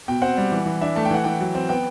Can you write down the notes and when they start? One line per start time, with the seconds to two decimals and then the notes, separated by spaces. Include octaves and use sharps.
0.08 B2 G5
0.22 C4 F#5
0.37 G3
0.52 E3
0.66 E3
0.81 D4 E5
0.96 A3 A5
1.05 G5
1.11 E3 F#5
1.24 E3 G5
1.41 F#3
1.55 C4
1.69 B3 G5